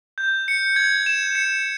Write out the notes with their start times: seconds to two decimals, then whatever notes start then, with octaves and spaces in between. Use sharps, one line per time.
0.18 G6
0.48 C#7
0.76 G#6
1.06 E7
1.35 C#7